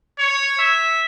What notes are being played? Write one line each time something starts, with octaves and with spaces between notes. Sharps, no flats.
C#5
E5